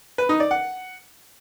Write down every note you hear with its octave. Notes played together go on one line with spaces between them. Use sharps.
B4
D#4
D5
F#5